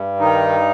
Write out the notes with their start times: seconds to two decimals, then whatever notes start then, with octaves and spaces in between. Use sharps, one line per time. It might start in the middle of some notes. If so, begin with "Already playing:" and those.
Already playing: G2
0.20 D#3 D#4